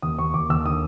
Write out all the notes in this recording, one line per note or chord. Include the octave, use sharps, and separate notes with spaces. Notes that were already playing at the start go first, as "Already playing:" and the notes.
D#2 D#6
D#2 C#6
D#2 D6
D#2 E6
D3 D#6